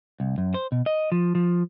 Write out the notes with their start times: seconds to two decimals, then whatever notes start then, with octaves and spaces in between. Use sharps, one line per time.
0.20 C2
0.38 F#2
0.54 C5
0.72 B2
0.86 D#5
1.12 F3
1.35 F3